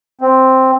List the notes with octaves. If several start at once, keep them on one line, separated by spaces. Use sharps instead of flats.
C4